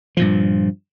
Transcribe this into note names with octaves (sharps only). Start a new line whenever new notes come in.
G2 A#2 F3